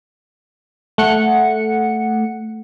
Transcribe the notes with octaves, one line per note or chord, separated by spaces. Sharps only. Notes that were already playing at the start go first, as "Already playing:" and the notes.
A3 F#5 C#7